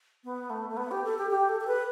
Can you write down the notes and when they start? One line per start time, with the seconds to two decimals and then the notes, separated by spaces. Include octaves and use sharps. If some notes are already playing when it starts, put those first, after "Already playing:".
0.24 B3
0.50 A3
0.69 A3
0.77 B3
0.91 G4
1.04 A4
1.18 G4
1.31 G4
1.49 A4
1.60 A4
1.67 B4